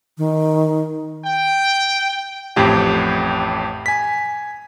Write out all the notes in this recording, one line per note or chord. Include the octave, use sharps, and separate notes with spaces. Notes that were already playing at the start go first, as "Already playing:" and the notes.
D#3
G5
A1 F2 A2 G4 G5
G#5 B6